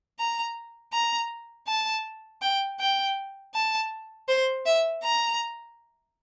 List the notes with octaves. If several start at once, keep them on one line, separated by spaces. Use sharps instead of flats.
A#5
A#5
A5
G5
G5
A5
C5
E5
A#5